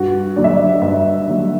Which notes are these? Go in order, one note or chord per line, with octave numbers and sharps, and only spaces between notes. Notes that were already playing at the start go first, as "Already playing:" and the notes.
Already playing: G2 F#4
D3 F#3 D5
E5
D5
G2 E5
D3 F#3